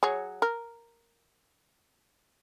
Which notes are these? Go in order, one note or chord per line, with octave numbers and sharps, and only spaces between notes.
F#3 G#4 C#5
A#4